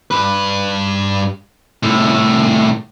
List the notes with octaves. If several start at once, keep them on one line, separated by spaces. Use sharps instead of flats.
G2 B4
C2 A2